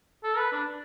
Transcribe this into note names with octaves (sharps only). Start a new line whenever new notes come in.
A4
B4
D4